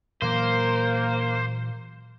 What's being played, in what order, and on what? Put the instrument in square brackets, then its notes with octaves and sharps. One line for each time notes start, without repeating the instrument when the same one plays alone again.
[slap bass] A#2 E3 F#3 [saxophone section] A#3 [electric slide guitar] C5